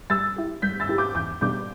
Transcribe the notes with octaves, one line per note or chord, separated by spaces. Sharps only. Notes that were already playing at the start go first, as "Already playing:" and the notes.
G3 E6 A6
E4 G4
G3 G6 B6
E6 A6
E4 G4
D6 G6
E2 D6 G6
B2 G3 D4 G4 D6 G6